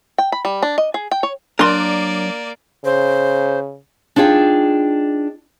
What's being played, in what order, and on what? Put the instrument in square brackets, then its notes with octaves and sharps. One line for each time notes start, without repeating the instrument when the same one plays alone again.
[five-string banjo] G5
B5
G3
D4
D#5
G#4
G5
C#5
[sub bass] F#3 [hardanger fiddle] A#3 D5 [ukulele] D4 [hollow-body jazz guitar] A#4 C6
[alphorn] C#3 [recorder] C5
[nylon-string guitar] D4 D#4 F4 G#4 G5